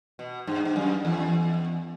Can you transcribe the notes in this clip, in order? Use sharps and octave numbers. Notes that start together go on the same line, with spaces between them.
B2
G2
G2
F#2
E2